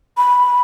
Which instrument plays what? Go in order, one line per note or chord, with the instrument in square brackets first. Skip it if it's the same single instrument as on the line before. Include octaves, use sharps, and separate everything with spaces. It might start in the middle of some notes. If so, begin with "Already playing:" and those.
[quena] B5